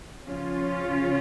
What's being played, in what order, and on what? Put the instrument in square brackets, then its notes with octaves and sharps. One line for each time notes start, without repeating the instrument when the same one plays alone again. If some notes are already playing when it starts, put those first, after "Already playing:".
[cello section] C#3 F3 C#4 F4